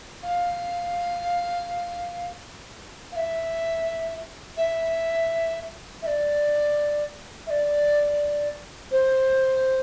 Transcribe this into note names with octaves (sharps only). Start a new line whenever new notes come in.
F5
F5
E5
E5
E5
D5
E5
D5
C5